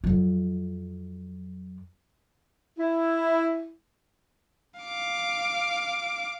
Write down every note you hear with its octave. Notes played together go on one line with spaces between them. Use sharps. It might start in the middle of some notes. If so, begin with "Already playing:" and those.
F2 F#3
E4
F5 D6